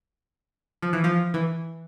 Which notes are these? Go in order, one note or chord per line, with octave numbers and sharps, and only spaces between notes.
F3
E3
F3
E3